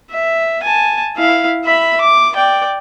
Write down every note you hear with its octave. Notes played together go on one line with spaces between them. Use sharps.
E5
G#5 A5
E4 F5
E5 B5
D6
D5 G5